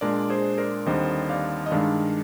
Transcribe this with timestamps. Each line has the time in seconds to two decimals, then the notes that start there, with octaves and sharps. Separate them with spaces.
0.01 A#2 G#3 D4 A#4 D5
0.30 G#4 C5
0.58 A#4 D5
0.86 D#2 D3 G3 C4 D#4 C5 D#5
1.29 D5 F5
1.66 D#5
1.71 G2 D#3 G#3 D4 D5 F5